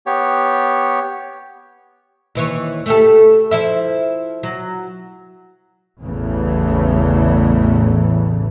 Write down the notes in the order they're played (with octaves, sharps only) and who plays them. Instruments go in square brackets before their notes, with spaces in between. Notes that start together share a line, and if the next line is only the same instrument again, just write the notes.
[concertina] B3 G4 C#5
[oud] D#2 E3 C#5
A3 G4 A4
F3 E4 E5
F#3
[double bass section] A1 E2 C#3 E3 A3